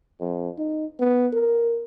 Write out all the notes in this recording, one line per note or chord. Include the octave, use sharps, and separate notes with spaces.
F2
D#4
B3
A#4